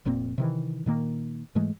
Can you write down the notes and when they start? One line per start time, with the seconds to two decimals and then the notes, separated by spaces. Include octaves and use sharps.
0.05 F1 A#2 A#3 C4
0.38 C3 D#3 E3
0.86 A#2 D#3 A#3
1.55 G#2 E3 G#3 A3